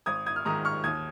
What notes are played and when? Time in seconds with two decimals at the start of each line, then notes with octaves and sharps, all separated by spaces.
0.06 G#1 D#6 G#6
0.26 D#6 G#6
0.36 F6
0.45 G#2 D#3 A#5 D#6
0.65 C#6 F6
0.84 D#2 D#6 G#6